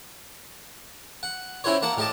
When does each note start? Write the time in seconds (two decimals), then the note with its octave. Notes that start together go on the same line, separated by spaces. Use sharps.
1.23 F#5
1.64 C4 C#4 E4 F#4 C5 C#5
1.82 A#3 F#5 A5
1.97 A2 G4 D#5 A5